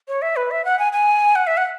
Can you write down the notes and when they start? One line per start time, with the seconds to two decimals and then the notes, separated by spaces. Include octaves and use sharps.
0.08 C#5
0.22 E5
0.36 B4
0.51 E5
0.65 F#5
0.79 G#5
0.93 G#5
1.35 F#5
1.47 E5
1.57 F#5